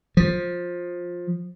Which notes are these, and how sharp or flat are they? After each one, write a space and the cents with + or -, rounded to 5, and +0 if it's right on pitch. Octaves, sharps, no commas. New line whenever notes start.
F3 +15